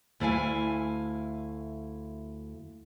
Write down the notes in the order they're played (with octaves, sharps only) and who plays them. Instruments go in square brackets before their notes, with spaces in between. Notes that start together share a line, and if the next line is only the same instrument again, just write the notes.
[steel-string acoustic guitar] D2 A3 E4 F5 G#5